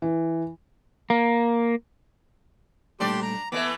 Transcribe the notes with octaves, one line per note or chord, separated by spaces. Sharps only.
E3
A#3
A#2 G3 A3 D4 G4 D5 C6
A#5
E3 A3 B3 D#5 E5 D6